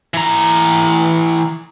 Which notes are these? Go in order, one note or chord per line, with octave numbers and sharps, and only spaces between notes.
E3 A#5